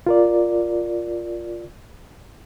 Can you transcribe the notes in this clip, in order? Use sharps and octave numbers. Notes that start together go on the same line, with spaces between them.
F4 A#4 D5